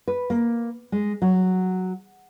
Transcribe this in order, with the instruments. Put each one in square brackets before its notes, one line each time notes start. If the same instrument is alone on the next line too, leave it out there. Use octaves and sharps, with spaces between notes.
[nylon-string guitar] B4
A#3
G#3
F#3